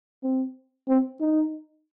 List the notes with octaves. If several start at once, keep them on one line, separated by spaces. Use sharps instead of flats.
C4
C4
D#4